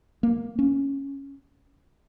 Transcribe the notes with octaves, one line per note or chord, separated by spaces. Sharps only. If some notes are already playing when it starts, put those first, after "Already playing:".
A#3
C#4